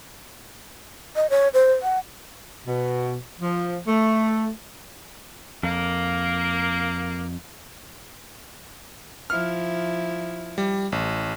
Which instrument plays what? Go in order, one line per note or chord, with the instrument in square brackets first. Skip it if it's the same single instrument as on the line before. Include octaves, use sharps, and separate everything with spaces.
[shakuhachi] D#5
C#5
C5
F#5
[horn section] B2
F3
A3
[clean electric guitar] F2 [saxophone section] A#3
[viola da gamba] F3 E4 [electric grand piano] F6
[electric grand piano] G3
A1